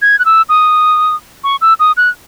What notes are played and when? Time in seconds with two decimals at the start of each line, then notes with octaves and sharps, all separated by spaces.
0.02 G#6
0.19 F#6
0.25 E6
0.49 D#6
1.44 C#6
1.61 E6
1.80 D#6
1.97 F#6